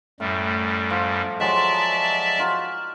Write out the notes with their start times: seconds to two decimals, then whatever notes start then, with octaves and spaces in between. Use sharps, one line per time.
0.20 F#2 A2 G3
0.90 F3 F#5
1.40 F3 F#3 G#3 D5 E5 A5
2.38 D#4 F4 F#4